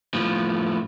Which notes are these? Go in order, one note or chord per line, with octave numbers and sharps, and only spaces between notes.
A2 F3